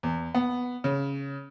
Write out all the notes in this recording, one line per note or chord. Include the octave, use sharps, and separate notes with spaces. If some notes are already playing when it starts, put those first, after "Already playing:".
E2
B3
C#3